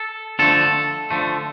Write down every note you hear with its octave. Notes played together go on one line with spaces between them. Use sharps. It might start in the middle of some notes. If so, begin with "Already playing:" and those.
Already playing: A4
D3 F3 A3 A4
D3 F3 A3